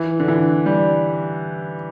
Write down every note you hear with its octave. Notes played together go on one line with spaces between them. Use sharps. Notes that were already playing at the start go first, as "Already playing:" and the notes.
Already playing: E3
D3
E3
G3